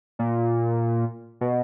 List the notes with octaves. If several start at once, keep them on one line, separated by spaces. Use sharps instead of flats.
A#2
B2